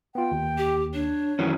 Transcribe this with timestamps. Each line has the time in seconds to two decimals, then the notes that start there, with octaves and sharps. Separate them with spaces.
0.15 B3 F4 G5
0.31 D#2
0.58 G4
0.93 D4 C#5
1.39 F#2 D#3 E3 C#4